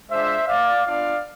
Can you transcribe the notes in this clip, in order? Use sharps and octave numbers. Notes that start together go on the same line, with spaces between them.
G#3 D4 F4 C5 E5
D5 F5
B3 D4 F4 D5 F5